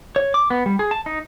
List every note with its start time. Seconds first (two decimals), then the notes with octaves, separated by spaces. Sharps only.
0.16 C#5
0.34 D6
0.50 B3
0.66 G3
0.79 G#4
0.91 A5
1.06 D#4